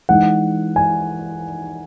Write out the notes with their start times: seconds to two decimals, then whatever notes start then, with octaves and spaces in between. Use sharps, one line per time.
0.09 E3 G#3 D#4 F#5
0.76 G#5